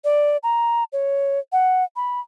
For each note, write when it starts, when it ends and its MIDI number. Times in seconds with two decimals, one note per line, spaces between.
0.04 0.37 74
0.43 0.84 82
0.93 1.39 73
1.52 1.84 78
1.96 2.20 83